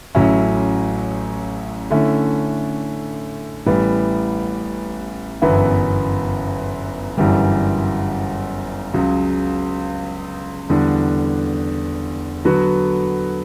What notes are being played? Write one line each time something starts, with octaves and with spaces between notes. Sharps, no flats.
A1 A2 F#3 C#4 E4
D3 A3 C#4 E4
A1 A2 E3 G3 B3
G1 F#2 E3 B3 E4
G1 F#2 E3 G3
C#2 C#3 F#3
E2 D3 G3 D4
D3 F#3 B3 F#4